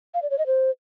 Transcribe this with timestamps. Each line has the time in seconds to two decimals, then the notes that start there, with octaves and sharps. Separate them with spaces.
0.14 F5
0.22 D5
0.30 C#5
0.38 D#5
0.47 C5